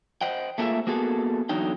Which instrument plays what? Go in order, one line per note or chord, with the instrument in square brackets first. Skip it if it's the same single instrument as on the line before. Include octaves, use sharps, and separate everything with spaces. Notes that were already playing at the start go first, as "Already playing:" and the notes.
[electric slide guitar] C5 D#5 F#5 G5
A3 A#3 D4 F4 G#4 E5
A#3 B3 F#4 G#4 A4
E2 D3 F#3 D#4 G5